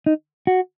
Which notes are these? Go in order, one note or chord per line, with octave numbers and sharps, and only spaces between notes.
D#4
F#4